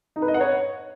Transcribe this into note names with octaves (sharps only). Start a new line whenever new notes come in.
D#4
B4
D#5
F#5
C#5